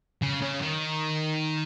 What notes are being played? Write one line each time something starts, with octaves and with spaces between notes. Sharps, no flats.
C#3
C#3
D#3